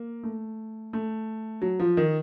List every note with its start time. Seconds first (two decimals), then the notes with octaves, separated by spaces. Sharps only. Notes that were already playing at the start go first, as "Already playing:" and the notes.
Already playing: A#3
0.23 A3
0.93 A3
1.62 F#3
1.80 F3
1.97 D#3